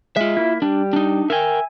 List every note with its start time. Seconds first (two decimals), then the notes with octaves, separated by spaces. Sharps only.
0.16 G#3 F4 E5
0.37 A#3 E4
0.62 G3 D4
0.93 D4 D#4
1.30 A#4 E5 G5 G#5